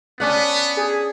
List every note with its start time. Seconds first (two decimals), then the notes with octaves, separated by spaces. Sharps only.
0.20 B3 C#4 D4 F#5
0.77 G#4